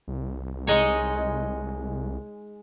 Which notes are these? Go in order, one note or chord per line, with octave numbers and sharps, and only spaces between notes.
C2
G#3 D#4 C#5